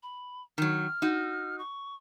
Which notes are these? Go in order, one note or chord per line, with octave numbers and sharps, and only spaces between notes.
B5
D#3 F#3 F6
D#4 F#4
C#6